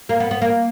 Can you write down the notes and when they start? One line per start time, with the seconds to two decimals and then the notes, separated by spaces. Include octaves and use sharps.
0.09 A#3
0.20 B3
0.31 B3
0.42 A#3